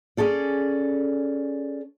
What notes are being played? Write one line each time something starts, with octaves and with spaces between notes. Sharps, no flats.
C#4 G#4 A4 D5